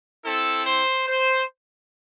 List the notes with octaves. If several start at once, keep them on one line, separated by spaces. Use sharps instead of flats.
C4 E4 A4
C5
C5